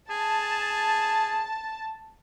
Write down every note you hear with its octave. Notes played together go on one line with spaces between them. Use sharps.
G#4 A5